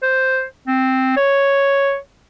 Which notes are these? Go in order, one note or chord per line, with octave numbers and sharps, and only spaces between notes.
C5
C4
C#5